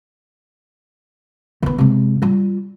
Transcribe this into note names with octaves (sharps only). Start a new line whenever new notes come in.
D#3 B3
C3 G#3
G3 F4